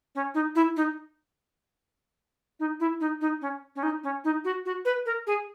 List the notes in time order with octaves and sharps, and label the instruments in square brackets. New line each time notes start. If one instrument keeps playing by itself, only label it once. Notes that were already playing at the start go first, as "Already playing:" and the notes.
[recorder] C#4
D#4
E4
D#4
D#4
E4
D#4
D#4
C#4
C#4
D#4
C#4
D#4
F#4
F#4
B4
A#4
G#4